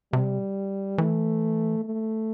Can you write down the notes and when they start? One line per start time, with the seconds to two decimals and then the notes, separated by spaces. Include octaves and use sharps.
0.13 C3 G3
0.98 E3 A3
1.85 A3